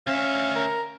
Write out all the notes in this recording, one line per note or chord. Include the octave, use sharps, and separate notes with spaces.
D2 C#4 E5 F5
A#4